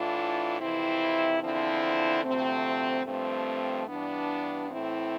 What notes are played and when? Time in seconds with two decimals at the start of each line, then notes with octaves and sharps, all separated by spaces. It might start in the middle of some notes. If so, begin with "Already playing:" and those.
Already playing: A2 E3 D4 F4
0.60 F2 C3 E3 C4 E4
1.42 E2 D3 F3 C4 E4
2.24 D2 C3 F3 A3 C4
3.06 G2 F3 A3 C4
3.88 G2 E3 B3 D4
4.69 A2 E3 C4 E4